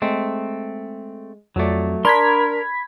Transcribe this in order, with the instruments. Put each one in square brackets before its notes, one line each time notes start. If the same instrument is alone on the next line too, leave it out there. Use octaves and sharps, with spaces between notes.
[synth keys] G#3 [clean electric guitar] A3 C4
[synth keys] F2 D5 [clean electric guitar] F#3 A3
[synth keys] D4 [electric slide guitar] A#4 [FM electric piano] B5 G#6 B6 [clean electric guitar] C6